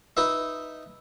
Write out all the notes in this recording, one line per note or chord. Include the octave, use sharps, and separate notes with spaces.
D#4 B4 E5